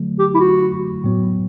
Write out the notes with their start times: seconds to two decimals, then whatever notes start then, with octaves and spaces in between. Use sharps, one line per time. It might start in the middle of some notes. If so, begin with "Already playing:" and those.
Already playing: D3 F#3 A3
0.19 G4
0.35 E4
0.40 F#4
1.04 A2 F#3 B3